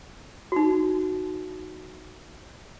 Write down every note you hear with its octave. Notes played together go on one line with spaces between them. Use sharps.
D#4 F#4